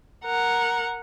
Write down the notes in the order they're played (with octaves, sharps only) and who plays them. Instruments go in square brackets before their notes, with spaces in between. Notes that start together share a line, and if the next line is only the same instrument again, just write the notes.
[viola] A#4 F#5